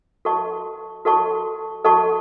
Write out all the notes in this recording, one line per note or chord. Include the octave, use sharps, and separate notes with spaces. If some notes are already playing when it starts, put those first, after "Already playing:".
F#4 A4 D#5 A5 C#6
F#4 A4 D#5 A5 C#6
F#4 A4 D#5 A5 C#6